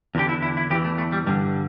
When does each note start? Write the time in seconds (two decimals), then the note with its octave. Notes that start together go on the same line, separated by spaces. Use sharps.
0.15 E2 D3 G4
0.29 E4
0.42 E4
0.57 E4
0.70 E2 G4
0.75 E3
0.85 A3
0.98 A3
1.12 G3
1.26 G2 D3 G3